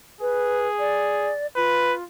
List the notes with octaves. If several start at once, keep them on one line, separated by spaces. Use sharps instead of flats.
G#4 B4
D5
F4 B4